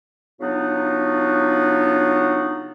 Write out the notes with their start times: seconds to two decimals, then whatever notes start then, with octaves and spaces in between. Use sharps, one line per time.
0.40 C#3 F#3 B3 D4 D#4 F4